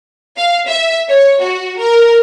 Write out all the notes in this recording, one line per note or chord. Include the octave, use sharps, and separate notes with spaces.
F5
E5
C#5
F#4
A#4